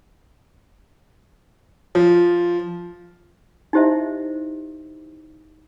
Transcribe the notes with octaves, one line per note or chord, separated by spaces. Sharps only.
F3
D#4 E4 G4 C5 D#5 E5